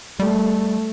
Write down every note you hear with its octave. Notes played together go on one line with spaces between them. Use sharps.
G3 A3